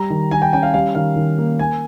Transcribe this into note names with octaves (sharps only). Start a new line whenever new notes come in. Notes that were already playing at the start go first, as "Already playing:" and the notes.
Already playing: G3 A#5
D#3
D#3 G#5
G5
C#4 G5
F5
G3 F5
D#3 F5
D#3
A#3
A#3 G#5